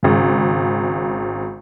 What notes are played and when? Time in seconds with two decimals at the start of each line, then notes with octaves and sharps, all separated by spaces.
0.03 G#1 C#3